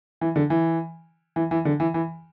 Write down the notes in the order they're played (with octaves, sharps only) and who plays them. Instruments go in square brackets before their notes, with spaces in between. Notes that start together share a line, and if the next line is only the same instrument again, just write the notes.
[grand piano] E3
D3
E3
E3
E3
D3
E3
E3